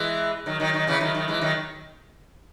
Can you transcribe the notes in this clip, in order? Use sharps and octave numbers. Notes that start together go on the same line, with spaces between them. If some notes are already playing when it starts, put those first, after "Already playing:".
Already playing: E3 G#3
D#3 F#3
D#3 F#3
D#3 F#3
C#3 E3
D#3 F#3
D#3 F#3
E3 G#3
D#3 F#3